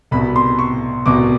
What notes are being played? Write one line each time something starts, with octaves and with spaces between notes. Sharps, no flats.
C2 B2 B5
C6
C#6
C2 B2 D6